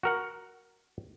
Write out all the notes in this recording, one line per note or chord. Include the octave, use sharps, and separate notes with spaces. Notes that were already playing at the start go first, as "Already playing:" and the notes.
F#4 A#4 F#5